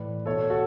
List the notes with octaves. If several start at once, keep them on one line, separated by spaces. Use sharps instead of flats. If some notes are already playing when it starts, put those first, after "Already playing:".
Already playing: A2 E3 B4 D5
B2 A4 C#5
F#4 A4